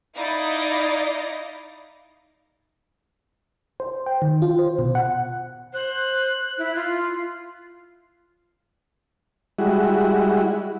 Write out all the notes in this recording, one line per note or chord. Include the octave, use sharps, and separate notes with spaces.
D#4 E4 D5 D#5 F5 A#6
C5
G5
D#3
F4
C5
B2
F#5
C5 F#6
E4
F4
G3 G#3 E4 F#4